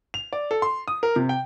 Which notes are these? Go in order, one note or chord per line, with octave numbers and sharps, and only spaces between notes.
F7
D5
A4
C6
D#6
A#4
C3
G5